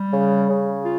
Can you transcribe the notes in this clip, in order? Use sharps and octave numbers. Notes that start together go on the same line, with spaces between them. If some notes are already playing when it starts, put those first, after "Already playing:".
Already playing: G3
C#3
C#3
F4